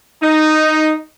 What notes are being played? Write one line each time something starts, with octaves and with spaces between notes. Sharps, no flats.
D#4